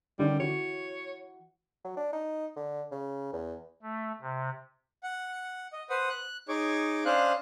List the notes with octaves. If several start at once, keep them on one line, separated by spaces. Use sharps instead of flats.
D3 D#3 G3 C#4
E3 F#4 C#5
F#3
D4
D#4
D3
C#3
E2
A3
C3
F#5
D#5
B4 C5 F#5 D#6
F#6
D#4 G#4 C#5 D6
C#4 D4 C5 D#5 F5 F#6